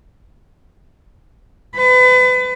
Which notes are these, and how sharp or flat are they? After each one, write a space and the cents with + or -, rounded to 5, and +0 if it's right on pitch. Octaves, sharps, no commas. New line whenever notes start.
B4 +35